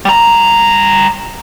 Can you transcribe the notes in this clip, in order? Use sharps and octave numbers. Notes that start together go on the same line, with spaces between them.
G3 A#5